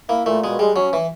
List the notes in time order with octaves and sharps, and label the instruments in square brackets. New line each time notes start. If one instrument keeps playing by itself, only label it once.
[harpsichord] A#3 [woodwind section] E4
[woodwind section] A#2 [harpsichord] A3
[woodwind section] B2 [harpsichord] G#3
[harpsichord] G3 [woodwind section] G#3
[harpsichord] F#3 [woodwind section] C#4
[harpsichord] E3